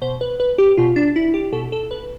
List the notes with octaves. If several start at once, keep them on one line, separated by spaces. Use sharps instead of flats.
B2 C5
B4
B4
G4
B2 F4
D4
E4
G4
B2 A4
A4
B4